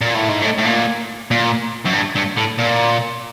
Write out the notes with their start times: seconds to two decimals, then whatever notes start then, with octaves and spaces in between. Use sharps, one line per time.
0.01 A#2
0.15 A2
0.29 G#2
0.42 A2
0.58 A2
0.65 A#2
1.31 A#2
1.86 F#2
1.94 G2
2.16 G2
2.37 A2
2.59 A#2